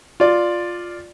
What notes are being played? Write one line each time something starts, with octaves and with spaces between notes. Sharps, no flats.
F4 D5